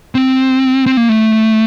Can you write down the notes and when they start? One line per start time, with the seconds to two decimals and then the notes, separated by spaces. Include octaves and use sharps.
0.15 C4
0.86 C4
0.97 A#3
1.09 A3